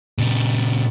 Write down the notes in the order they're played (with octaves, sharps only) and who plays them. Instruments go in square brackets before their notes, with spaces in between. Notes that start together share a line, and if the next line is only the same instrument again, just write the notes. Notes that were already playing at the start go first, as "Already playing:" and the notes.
[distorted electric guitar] A#2 C#3